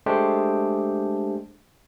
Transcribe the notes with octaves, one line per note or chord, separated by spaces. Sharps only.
G#3 A3 D4 G4 C5